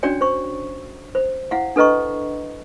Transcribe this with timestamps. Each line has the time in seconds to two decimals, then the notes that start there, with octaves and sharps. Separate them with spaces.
0.03 C#4 D4 F#4 C#5 D5 G5
0.21 C5 C#6
1.15 C5
1.51 E4 F5 F#5
1.76 D4 A4 B4 D#5 A#5 C#6